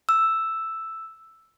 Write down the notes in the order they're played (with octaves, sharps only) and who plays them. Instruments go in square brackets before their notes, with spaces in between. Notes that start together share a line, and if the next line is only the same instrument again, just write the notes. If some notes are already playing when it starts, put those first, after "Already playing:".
[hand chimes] E6